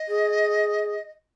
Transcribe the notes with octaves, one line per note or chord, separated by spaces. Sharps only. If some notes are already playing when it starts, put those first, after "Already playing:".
Already playing: D#5
G#4